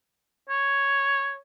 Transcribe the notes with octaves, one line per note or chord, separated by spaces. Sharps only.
C#5